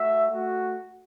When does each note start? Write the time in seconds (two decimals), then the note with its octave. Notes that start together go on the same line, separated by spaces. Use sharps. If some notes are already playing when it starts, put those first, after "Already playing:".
Already playing: A3 F#4 E5
0.30 A3 F#4